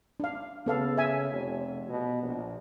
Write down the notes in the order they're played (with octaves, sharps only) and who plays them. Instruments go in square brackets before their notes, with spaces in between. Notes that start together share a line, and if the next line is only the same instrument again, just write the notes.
[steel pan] D4 F5
[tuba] C#3 [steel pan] B3 A4 F5
[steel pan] E5 G#5
[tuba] F1
B2
A#1